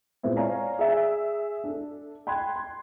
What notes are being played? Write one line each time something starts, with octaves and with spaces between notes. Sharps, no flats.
A#2 G#3 B3 C4 E4
C#5 D5 F5 G#5 A#5
G#4 E5
D4 A4
G5 B5 C6 F#6 G#6
C6